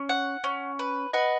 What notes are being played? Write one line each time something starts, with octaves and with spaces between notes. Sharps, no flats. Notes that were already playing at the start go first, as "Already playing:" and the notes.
Already playing: C#4
F#5
C#4
B4
B4 D#5 F#5